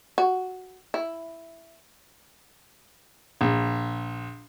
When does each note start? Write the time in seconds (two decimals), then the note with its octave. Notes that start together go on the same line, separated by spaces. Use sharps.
0.18 F#4
0.94 E4
3.41 A#1